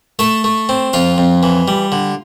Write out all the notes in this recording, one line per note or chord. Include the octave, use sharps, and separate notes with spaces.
A3 A4 A5
A3
C4
F2 F4 F5
F2
E3
G3
D3